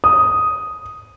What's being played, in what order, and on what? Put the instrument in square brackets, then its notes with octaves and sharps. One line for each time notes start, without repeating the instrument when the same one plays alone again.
[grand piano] D#6